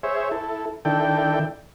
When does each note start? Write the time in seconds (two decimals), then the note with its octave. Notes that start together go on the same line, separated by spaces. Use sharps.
0.03 G#4 C5 C#5 E5
0.31 E4 A4
0.85 D#3 D4 E4 A4 G5